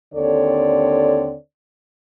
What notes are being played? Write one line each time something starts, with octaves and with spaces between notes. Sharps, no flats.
D#2 D3 C4 A4 C#5 D5